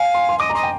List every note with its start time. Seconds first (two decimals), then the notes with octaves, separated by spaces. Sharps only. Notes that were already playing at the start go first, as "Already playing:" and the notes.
Already playing: F5 G#5
0.14 C6
0.29 C6
0.39 D#5 D6
0.50 A#5
0.55 D#5 C6
0.63 G5